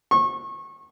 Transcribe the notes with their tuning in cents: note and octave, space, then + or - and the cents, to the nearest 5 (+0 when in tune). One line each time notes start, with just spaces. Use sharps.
C#6 -30